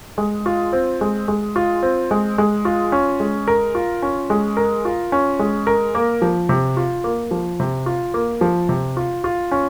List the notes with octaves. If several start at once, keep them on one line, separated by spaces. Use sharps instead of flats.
G#3
F4
C4
G#3
G#3
F4
C4
G#3
G#3
F4
C#4
G#3
A#4
F4
C#4
G#3
A#4
F4
C#4
G#3
A#4
A#3
F3
C3
F4
A#3
F3
C3
F4
A#3
F3
C3
F4
F4
C#4